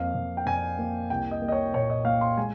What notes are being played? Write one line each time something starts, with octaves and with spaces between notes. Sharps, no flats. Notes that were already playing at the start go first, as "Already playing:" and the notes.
Already playing: F2 A#3 F5
F2
G5
F2 G#5
A#3
C2 G5
D#5
A#3
D#5
C#5
A#2 C#5
D#5
A#3 F5
C6
G#3 G#5